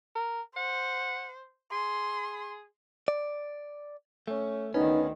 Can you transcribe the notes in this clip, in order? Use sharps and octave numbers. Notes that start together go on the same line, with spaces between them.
A#4
C5 F#5
G#4 C6
D5
A3 C#4
D2 D#3 B3 C#4 D#4